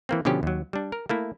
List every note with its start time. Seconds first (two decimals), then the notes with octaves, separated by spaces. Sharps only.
0.09 E3 A#3 C4
0.25 B2 D3 F3 C#4 G4
0.43 D#2 F#3
0.73 G3 D4
0.92 A#4
1.09 A3 A#3 E4